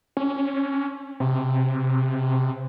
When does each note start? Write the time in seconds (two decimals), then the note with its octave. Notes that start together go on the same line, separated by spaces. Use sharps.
0.17 C#4
1.20 C3